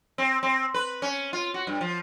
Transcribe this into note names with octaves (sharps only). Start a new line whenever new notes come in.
C4
C4
B4
C#4
F4
F#4
G2
F3